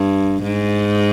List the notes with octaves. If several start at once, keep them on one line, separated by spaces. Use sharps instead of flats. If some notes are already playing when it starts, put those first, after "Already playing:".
Already playing: G2
G#2